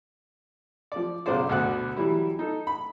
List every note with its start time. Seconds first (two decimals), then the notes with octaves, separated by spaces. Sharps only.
0.92 F3 D5
1.26 B1 C#3 G#4 C5 D5
1.49 D2 B2 D5 F#5 F#6
1.97 E3 F#3 G3 E4
2.39 D#4 A4
2.67 B5